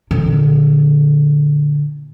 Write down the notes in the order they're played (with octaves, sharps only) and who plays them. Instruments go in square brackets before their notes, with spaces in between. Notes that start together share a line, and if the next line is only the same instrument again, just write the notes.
[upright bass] A#2 D3